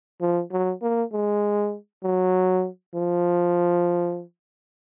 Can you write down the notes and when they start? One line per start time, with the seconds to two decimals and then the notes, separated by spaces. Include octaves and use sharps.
0.21 F3
0.51 F#3
0.82 A#3
1.13 G#3
2.04 F#3
2.95 F3